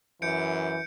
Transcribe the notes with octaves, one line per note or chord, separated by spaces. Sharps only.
F#2 E3 G6 C#7 D7